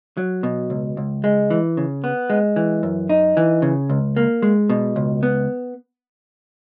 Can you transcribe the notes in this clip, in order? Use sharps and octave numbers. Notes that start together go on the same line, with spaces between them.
F#3
B2
C#2
C#2
G#3
E3
C#3
B3
G#3
E3
F#2
D#4
E3
C#3
C#2
A#3
G#3
B2
C#2
B3